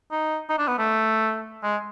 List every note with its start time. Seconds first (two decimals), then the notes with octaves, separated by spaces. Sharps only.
0.11 D#4
0.49 D#4
0.58 D4
0.67 B3
0.78 A3
1.63 G#3